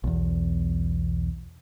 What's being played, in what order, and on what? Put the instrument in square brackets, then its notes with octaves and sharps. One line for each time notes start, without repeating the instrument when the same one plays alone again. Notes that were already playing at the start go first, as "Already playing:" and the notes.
[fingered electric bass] B1 E2